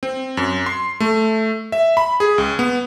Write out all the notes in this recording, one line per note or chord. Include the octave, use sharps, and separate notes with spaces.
C4
F#2
C6
A3
E5
B5
G#4
C#2
B3